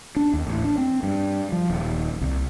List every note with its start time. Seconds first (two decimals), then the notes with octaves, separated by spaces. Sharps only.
0.16 D4
0.33 D#2
0.47 A1
0.64 D4
0.78 C4
1.03 G2
1.52 F3
1.70 D#1
2.21 C2